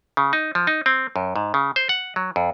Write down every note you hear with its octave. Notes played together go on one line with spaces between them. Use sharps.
C#3
D#4
F3
D#4
C4
F#2
G#2
C#3
C5
F#5
F#3
F2